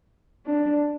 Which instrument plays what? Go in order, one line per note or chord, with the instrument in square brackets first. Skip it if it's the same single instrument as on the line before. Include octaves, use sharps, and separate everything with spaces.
[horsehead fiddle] D4